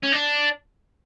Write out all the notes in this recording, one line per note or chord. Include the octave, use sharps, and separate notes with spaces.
C#4
D4